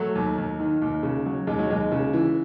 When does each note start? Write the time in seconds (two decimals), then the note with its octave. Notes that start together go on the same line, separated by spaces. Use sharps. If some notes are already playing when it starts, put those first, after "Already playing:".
Already playing: F#3 A3
0.15 D#2
0.38 D#2
0.60 D#3
0.82 D#2
1.03 C#3
1.26 F#3
1.47 D#2 G#3
1.59 F#3
1.70 D#2 G#3
1.92 C#3
2.13 E3